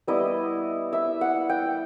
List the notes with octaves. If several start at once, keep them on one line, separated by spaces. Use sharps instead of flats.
G3 B3 E4 D#5
E5
F#5
G5